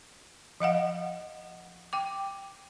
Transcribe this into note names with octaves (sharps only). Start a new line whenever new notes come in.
F3 D#5 F5 F#5
G5 D6